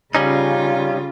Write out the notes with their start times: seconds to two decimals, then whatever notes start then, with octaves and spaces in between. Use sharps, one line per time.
0.15 C#3 G3 C#4 D#4 F4